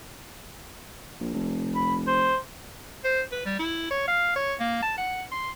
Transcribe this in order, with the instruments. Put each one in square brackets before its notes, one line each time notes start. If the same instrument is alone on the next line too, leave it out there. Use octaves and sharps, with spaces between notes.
[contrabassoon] A#1
F1
[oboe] B5
C5
[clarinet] C5
B4
G3
E4
C#5
F5
C#5
A#3
A5
F#5
C6